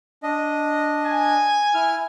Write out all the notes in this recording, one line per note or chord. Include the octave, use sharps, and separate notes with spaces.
D4 D#5
G#5
E4 F6